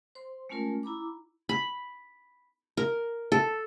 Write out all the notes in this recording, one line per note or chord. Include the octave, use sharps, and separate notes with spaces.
C5 C6
G#3 A3 C#4 F4 A#4
E4 A#5 B5 D6
B5
A#4
A4